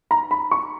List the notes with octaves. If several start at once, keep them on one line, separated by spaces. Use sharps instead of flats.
A#5
B5
C#6